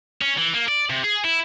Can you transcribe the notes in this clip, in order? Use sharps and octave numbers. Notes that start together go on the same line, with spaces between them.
C#4
E3
A#3
D5
C3
G#4
E4